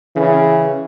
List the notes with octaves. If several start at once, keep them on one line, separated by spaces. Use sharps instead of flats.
C#3 E3